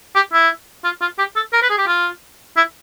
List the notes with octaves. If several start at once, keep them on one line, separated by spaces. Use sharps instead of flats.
G4
E4
F4
F4
G4
A4
A#4
B4
G#4
G4
F4
E4